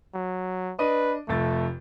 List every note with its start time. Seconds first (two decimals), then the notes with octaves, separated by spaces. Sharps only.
0.14 F#3
0.79 D4 B4 D#5 D#7
1.28 F1 F2 A3 A6